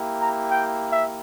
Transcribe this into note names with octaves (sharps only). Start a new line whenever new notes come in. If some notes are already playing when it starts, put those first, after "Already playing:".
Already playing: A#3 E4 G4
A#5
G5
E5